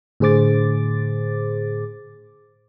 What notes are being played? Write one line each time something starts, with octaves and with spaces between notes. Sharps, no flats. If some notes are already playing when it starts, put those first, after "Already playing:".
A2 D3 G#4 C5 D6 A6